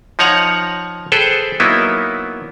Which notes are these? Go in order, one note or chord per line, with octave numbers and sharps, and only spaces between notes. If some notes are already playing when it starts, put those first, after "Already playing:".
F3 D#4 C#5 F#5 A#5
G#4 A4 B4 C5 G5
F#3 A#3 B3 D#4 E4